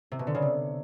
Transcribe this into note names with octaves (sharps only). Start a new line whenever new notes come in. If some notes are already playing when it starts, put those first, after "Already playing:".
C3
B2
D3
C#3
C3